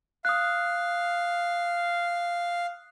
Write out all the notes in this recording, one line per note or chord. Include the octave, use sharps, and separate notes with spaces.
F5 D#6 F#6